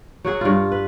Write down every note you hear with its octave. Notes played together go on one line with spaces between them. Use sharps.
F#3 F#4 G#4
G2 F4
B4